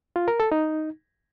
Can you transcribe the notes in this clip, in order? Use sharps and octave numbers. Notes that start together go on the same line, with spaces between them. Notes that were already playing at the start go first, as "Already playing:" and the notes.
F4
A#4
A4
D#4